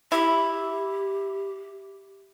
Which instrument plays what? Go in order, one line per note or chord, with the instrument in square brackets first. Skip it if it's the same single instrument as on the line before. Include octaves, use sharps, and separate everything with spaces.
[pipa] E4 [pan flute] G4